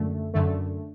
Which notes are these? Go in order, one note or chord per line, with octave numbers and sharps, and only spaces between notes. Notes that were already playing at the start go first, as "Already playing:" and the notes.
Already playing: F#2 D3 A3
F#2 D3 A3